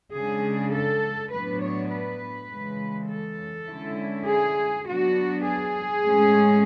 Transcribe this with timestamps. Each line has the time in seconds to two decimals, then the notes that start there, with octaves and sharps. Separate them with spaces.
0.14 C#3 G#3 D4 G#4
0.73 A4
1.32 A2 F#3 B3 D4 B4
1.62 C#5
1.91 B4
2.50 C#3 E3 G#3
3.09 A4
3.67 D3 G#3 C#4 E4
4.27 G#4
4.85 F#3 B3 D4 F#4
5.45 G#4
6.04 A2 G#3 C#4